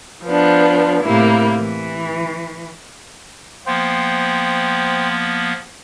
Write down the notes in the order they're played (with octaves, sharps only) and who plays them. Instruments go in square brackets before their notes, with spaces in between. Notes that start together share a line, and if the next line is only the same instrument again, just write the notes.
[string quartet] F3 B3 D4
A2 C3 A#3 E4
E3
[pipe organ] F3 A#3 B3 [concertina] C5 G5